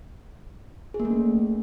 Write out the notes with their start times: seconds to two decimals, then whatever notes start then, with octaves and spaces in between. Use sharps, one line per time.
0.94 G#4
1.00 A#3
1.05 A3
1.10 C#4